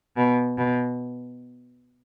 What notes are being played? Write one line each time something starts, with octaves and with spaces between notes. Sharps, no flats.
B2
B2